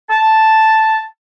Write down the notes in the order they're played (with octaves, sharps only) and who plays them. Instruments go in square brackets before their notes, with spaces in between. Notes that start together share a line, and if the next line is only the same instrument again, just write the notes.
[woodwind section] A5